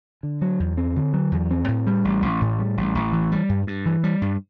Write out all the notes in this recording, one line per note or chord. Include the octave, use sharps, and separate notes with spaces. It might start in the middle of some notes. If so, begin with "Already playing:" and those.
D3
F#3
E2
C4
D3
F#3
E2
C4
A2
G3
A1
A1
A2
G3
A1
A1
E3
G3
G2
G2
E3
G3
G2